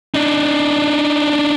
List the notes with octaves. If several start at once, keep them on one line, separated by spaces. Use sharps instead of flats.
D4 D#4